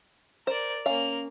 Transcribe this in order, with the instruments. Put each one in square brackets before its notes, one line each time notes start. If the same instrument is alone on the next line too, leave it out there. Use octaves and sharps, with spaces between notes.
[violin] A#4 D5 [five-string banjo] C5
[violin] A#3 F7 [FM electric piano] C#4 [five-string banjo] F5